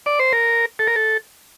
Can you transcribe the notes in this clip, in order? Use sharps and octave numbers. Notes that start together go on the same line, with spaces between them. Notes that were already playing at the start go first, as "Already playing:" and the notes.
D5
C5
A#4
A4
A#4
A4